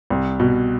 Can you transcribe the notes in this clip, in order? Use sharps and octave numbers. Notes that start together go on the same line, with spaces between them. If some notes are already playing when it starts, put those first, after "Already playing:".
C2
B2